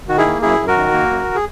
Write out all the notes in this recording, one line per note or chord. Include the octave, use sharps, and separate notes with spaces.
D#3 F#4
E4 G#4
A#3
F#2 E4 G#4
F#2
F#4 A#4
D#3
A#3
F#2
G#4